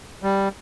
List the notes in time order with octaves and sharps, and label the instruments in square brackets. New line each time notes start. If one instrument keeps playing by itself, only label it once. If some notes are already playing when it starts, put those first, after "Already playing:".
[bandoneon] G3